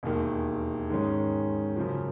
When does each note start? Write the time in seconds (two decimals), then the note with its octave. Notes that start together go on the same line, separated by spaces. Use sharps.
0.03 E1 D#2 D#3
0.90 G#2 D#3 G#3 C#4
1.76 F#2 C#3 F3